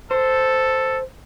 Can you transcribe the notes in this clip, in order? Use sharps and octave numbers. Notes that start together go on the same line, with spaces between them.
A4 C5